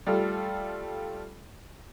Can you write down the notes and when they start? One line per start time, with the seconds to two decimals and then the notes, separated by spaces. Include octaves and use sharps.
0.07 G3 A3 F4 A4